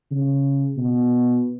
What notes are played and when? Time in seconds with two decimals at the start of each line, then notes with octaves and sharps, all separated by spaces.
0.11 C#3
0.77 B2